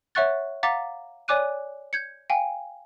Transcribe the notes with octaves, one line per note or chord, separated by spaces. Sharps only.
C#5 E5 F#5 C#6 F#6 A6
F5 F#5 A#5 D6 A6 B6
C#5 D5 G#5 D6 F#6 D#7
G6 G#6 C#7
F5 G5 G#5